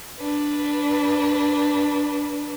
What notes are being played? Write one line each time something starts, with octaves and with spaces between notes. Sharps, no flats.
D4 B4